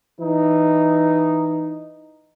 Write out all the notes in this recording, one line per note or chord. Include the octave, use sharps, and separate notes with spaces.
E3 D#4